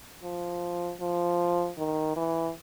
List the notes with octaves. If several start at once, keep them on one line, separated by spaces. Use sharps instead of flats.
F3
F3
D#3
E3